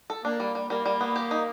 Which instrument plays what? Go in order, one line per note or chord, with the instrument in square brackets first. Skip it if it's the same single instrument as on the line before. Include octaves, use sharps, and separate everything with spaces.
[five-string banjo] A4
[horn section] A#3 [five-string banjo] D4
[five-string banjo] G3
G3
[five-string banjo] G3 [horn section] A#3
[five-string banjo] G3
B3
G4
D#4